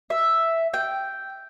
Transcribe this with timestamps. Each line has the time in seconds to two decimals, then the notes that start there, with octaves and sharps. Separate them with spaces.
0.10 E5
0.74 G5